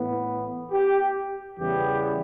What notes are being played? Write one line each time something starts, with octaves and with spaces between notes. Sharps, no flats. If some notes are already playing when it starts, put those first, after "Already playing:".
Already playing: A2 E3 B3
G4
E2 C#3 E3 G3 B3 G4